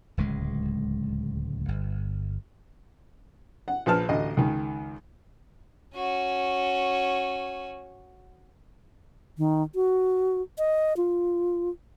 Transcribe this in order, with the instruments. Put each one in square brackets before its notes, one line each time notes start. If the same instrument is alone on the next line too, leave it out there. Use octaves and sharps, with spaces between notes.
[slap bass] D1 C#2 G#3
G1
[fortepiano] F#5
A#1 F3 B4 A5 F6
A1 D2 D#5
C#2 D#3
[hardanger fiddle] C#4 F#4
[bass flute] D#3
F#4
D#5
F4